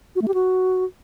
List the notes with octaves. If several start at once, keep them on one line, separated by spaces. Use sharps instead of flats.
F#4
A3
G4
F#4